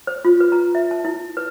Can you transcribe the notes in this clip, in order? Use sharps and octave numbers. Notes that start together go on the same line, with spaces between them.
C5
F4
B4
A#5
E5
A5
E4
B4